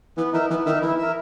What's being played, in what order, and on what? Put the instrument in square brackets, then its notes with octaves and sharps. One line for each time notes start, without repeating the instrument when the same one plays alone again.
[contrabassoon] E3 [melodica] B3
[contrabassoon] E3 [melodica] D#4 A#4 E5
[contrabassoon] E3 [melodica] B3
[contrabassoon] D#3 [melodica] D#4 A#4 E5
[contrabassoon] E3 [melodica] E4
[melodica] A#4 E5